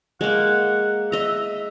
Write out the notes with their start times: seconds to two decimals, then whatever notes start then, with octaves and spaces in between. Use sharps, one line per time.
0.21 G#3 A#3 F#5
1.12 D#5 E5 A#5